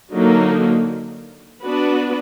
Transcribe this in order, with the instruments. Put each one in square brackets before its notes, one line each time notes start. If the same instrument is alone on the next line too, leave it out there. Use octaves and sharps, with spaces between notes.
[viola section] D3 F#3 A#3 D#4
B3 D4 F#4 B4